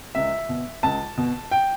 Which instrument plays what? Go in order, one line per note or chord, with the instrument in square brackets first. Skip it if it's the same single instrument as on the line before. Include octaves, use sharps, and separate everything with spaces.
[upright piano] C#2 E5
B2
C#2 A5
B2
G5